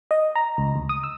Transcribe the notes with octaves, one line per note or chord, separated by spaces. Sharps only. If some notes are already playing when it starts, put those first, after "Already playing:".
D#5
A#5
C#2
D2
D#6
E6